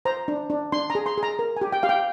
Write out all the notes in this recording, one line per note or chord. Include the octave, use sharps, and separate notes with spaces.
C5 A#5
D4
D4
D4 C6
A#5
G#4
C6
G#4
A#5
A#4
G#5
G4
G5
G4 F5
G5